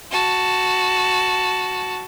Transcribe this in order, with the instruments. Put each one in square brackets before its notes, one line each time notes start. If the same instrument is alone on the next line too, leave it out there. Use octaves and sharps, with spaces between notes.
[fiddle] F#4 A5